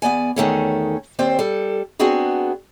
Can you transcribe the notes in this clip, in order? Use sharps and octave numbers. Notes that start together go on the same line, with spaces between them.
E2 B3 D5 G#5
E2 D#3 A3 C#4
D#2 C4 C5 D5
G3 A4
B3 C4 D4 F#4 G#4